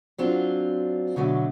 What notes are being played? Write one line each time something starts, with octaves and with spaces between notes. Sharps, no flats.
F#3 C4 D4 F4
B2 D3 F#3 A3